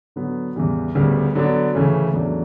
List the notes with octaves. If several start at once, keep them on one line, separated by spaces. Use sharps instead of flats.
D3 F#3 B3
E2 C#3 E3 G3
D2 C#3 G3 B3
D3 F#3 B3 D4
D2 C#3 E3 A3 C#4
E2 C#3 F#3 A3 D4